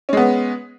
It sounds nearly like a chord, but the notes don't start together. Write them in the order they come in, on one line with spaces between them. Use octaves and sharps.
C#4 G#3 B3